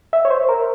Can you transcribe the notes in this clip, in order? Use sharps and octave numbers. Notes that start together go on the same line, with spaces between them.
E5
C#5
C5
A#4